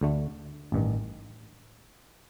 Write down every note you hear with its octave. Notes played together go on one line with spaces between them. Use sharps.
D2 D3 A3
A1 G2 D#3